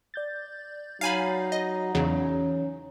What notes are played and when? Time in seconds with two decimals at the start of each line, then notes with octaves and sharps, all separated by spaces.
0.14 D5 G6 A6
1.01 F#3 D#4 F5 G#5 B5
1.52 D#5
1.95 E2 C#3 E3 F#3 C#4